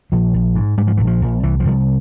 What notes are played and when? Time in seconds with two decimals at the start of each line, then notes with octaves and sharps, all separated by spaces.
0.12 A#1 F3
0.34 A#1
0.55 G#2
0.78 G#2 G3
0.87 F3
0.97 A#1 E3
1.07 F3
1.21 A#1
1.43 C2 E3
1.60 F3
1.65 C2